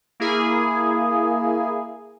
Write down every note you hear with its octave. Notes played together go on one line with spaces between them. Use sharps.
A#3 E4 G#4